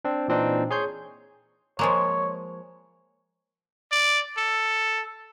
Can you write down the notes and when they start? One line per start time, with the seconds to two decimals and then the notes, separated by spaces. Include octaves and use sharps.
0.05 C4 D4
0.28 A#2 E3 C4 D4 D#4
0.71 G#4 C#5 C6 G6
1.79 F3 G#3 A#3 C#5
3.92 D5
4.38 A4